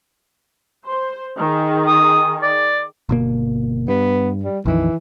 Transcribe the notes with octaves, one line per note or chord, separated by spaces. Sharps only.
C5
D#3 G#4
D#6
D5
G1 B2 A#3
G2 B3
G3
A#1 F2 D#3 E3